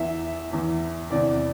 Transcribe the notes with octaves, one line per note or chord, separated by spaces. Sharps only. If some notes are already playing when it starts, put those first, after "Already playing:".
Already playing: E2 E3 E5
E2 E3
E2 C3 E3 D5